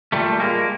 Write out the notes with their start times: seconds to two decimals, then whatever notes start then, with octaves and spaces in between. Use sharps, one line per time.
0.12 A#2 G3 A3
0.40 A#2 G#3 A#3